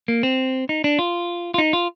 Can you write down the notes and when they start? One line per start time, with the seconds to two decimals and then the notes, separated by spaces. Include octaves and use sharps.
0.08 A#3
0.23 C4
0.69 D#4
0.84 D4
0.99 F4
1.54 F4
1.58 D#4
1.73 F4